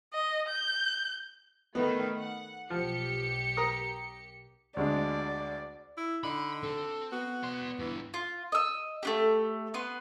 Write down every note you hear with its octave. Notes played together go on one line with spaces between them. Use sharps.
D#5
G6
D#3 A3 B3 B4
F#5
B1 F3 G4 C#7
A#4 A#5 D#6
D2 G#3 D4 D5
E4
D3 D#4 B5
C4 A4
B3 F#4
D5 C6
G2 D3 E3
F4
D#5 E6
A3 D4 G4
B3 B4 C6